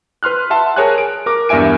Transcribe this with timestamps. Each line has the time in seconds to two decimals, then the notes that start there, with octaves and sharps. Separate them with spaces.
0.23 B4 C6 F6 F#6
0.50 E5 F#5 A5 C6
0.76 G#4 A#4 C#5 G#5 A5 F#6
0.98 D7
1.26 A#4 D6
1.49 E2 G2 A#4 E5 G#5 D7